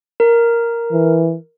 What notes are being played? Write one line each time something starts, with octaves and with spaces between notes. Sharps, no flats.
A#4
E3